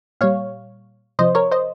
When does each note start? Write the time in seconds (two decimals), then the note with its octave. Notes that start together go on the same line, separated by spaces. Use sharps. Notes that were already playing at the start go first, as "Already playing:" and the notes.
0.21 A#2 G3 C#5 F5
1.19 C3 F3 C5 D#5
1.35 A#4 C#5
1.51 C5 D#5